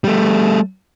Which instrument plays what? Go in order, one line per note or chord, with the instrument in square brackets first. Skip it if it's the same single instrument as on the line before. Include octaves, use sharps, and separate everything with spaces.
[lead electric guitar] G3 A3